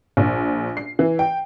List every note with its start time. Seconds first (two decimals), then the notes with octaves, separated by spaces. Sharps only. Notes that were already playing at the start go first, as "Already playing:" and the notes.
0.17 A#1
0.77 C7
0.99 E3
1.19 G5